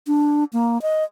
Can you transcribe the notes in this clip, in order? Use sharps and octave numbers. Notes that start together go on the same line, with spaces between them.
D4
A#3
D#5